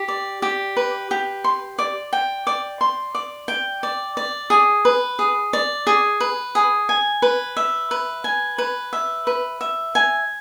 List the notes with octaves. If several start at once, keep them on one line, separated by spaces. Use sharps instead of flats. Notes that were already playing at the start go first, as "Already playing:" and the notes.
Already playing: G4
D5
G4
B4
G4
C6
D5
G5
D5
C6
D5
G5
D5
D5
G#4
B4
G#4
D5
G#4
B4
G#4
G#5
B4
E5
B4
G#5
B4
E5
B4
E5
G#5